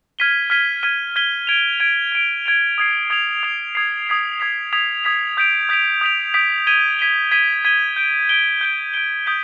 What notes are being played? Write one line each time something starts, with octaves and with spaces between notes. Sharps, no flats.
F6 G#6 B6 D#7 G7
F6 G#6 B6 D#7 G7
F6 G#6 B6 D#7 G7
F6 G#6 B6 D#7 G7
G#6 D7 F7
G#6 D7 F7
G#6 D7 F7
G#6 D7 F7
D#6 G#6 C7 F7
D#6 G#6 C7 F7
D#6 G#6 C7 F7
D#6 G#6 C7 F7
D#6 G#6 B6 F7
D#6 G#6 B6 F7
D#6 G#6 B6 F7
D#6 G#6 B6 F7
D#6 G6 B6 D7 F7
D#6 G6 B6 D7 F7
D#6 G6 B6 D7 F7
D#6 G6 B6 D7 F7
G#6 B6 D#7 G7
G#6 B6 D#7 G7
G#6 B6 D#7 G7
G#6 B6 D#7 G7
G6 D7 G7
G6 D7 G7
G6 D7 G7
G6 D7 G7
D#6 G6 B6 D7 G7